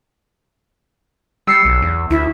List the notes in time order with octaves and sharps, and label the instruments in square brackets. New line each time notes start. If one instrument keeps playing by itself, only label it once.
[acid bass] G3 [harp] E6 C7 C#7
[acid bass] B1
E2
[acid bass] D2 [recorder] E4